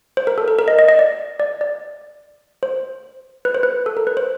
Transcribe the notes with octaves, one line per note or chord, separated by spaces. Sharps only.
C5
A#4
A4
A#4
A#4
D#5
D#5
D#5
D5
D5
D5
C5
B4
C5
B4
A4
A#4
B4
C5